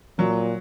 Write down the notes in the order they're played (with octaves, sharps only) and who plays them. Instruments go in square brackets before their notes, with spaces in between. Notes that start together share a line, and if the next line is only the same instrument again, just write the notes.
[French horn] A#2 [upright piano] F#3